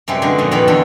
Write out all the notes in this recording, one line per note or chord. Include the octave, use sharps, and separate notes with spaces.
F#2 C3 G3 G#3 G4
B2 D3 G#3 D4 D#4
F2 A#2 C#3 D#5
F#2 B2 D#3 D5 F5 B5
E2 D3 F#3 F4 A4 B5